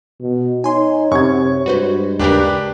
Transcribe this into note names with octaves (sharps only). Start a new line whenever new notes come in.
B2
D#4 C#5 G#5 C6
F#2 C3 C#6 G#6
G2 G#3 F#4 B4 C5
D#2 C#3 D4 G4 A#4 B4